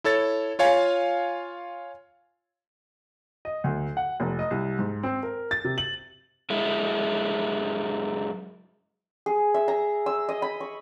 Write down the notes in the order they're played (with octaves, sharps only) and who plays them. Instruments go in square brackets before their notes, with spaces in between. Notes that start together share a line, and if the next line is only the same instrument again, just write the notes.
[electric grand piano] E4 A4 C#5 A6
F4 C#5 F5 G#5
[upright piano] D#5
D2
F#5
F1
D#5
C2
G#2
C4
A#4
A6
C3
F#7
[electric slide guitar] F#2 G#3 E4
[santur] G#4
E5
A#5
E6
D#5
B5
C#6